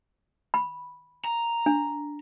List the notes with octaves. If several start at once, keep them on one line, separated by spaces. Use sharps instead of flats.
B5
A#5
D4